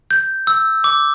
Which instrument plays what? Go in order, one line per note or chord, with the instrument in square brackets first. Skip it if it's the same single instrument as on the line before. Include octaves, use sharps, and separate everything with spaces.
[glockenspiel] G6
E6
D6